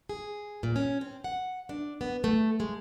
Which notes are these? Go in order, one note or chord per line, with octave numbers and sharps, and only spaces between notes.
G#4
A#2
C#4
C4
F#5
D4
B3
A3
G#3